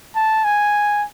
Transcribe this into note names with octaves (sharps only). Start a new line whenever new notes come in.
A5
G#5